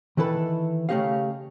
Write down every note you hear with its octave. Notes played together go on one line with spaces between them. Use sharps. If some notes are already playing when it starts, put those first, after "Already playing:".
D#3 E3 E4 A4 B4
C#3 A3 C#4 G4 D#5 F5